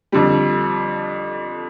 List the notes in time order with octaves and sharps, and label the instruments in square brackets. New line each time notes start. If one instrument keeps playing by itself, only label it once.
[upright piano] F2 D3 G3